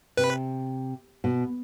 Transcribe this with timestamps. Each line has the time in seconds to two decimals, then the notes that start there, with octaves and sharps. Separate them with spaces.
0.17 C3 B4
1.24 B2